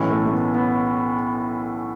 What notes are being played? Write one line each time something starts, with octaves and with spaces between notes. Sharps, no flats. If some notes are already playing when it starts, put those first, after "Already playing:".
Already playing: B1 A2 E3 C#4
A3
A3
B3
B3